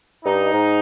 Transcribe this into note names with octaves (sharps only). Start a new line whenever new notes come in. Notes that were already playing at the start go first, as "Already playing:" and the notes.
G2 D#4
G#2